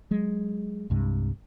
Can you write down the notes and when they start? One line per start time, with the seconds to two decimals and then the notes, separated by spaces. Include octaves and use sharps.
0.11 F#3 G#3
0.90 C2 G2 C3 G#3